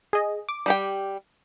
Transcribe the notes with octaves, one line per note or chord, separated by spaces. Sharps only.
G#4 D#5
D6
G3 G4 G5